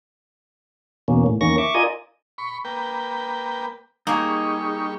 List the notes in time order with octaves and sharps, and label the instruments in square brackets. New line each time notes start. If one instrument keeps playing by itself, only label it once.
[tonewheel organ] E2 B2 A#3 C#4
A2
E2 D#3 A#3 C#4 C#6 A#6
E5 C#6 D6
F4 A#4 D5 D#5 G#5 D#6
[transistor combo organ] B5 C#6
A#3 B4 G5
[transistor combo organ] G3 C#6 [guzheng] A#3 G#4 [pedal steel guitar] D#4